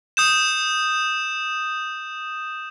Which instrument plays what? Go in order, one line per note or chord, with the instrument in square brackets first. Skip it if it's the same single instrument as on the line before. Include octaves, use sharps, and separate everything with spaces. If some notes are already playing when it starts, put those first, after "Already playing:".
[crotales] D#6 G6 E7